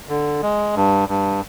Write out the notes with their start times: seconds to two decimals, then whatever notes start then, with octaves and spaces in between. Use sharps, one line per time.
0.09 D3
0.43 G#3
0.76 G2
1.09 G2